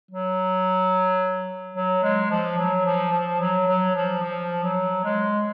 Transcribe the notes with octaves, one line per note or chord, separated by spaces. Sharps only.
F#3
F#3
G#3
F3
F#3
F3
F3
F#3
F#3
F3
F3
F#3
G#3